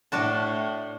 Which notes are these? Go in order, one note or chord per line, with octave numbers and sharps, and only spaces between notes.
A2 D4 F#4 A5